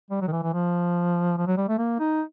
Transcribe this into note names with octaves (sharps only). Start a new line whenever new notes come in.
G3
F#3
D#3
E3
E3
F3
F3
F#3
G3
A3
A#3
D#4